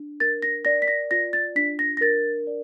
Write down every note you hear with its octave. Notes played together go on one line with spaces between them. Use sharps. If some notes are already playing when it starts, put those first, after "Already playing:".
Already playing: D4
A#4 A6
A#6
D5 A#6
B6
A#6
F4 A#6
A6
D4 B6
A#6
A#6
A#4 A6
D5